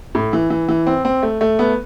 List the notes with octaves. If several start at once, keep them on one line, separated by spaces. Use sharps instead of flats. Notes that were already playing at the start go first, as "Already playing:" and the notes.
A2
E3
E3
E3
C4
C4
A3
A3
B3